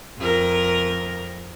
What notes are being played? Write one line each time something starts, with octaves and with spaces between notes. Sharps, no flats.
F2 A#4